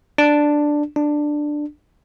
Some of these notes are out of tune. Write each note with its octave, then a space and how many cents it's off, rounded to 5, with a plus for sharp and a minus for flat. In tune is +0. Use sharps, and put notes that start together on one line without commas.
D4 +5
D4 +10